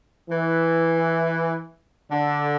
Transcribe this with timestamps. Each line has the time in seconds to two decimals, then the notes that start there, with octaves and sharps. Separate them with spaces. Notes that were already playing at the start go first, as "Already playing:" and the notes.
0.29 E3
2.11 D3